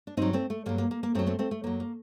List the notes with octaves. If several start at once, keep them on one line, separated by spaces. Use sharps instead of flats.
D4
G2 F#3 C4 D#4
A3 C4
A3
G2 F#3 A#3
A#3
A#3
A#3
F#2 F#3 A3 C4
A3 C4
A3 C4
A3
F#2 F#3 A#3
A#3